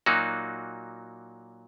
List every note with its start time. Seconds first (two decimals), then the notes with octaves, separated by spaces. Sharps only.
0.06 A#2 F#3 A#3 D#4 F#4